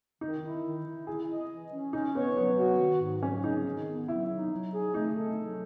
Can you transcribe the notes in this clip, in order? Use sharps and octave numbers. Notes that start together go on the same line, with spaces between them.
D#3 D#4
E4
D#3
E4
E4 G#4
D#5
E3
C#4
C#4 D#4
B3 C#5
F#3 B3
F#4
D#3
G#2
F#3 C#4
D#4 G#4
D#3
B3
F#3 E4
D#4
F#3
G#4
A3 D#4
A4
F#3